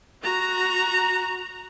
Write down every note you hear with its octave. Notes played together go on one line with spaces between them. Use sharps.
F#4 A#5